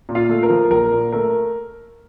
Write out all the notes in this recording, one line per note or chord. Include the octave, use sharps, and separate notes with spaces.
A#2
F4 F5
A3
A#4
F3
A#1 A#4
A#2
A3 A#4